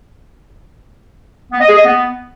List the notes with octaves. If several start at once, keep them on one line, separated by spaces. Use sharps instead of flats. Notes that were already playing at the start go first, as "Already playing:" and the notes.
B3
D#5
G#4
D#5
B3